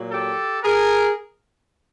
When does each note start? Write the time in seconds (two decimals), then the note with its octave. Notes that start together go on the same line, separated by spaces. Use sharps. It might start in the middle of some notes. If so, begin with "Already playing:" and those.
Already playing: A#2 F#3
0.11 G4 A4
0.63 G#4 A#4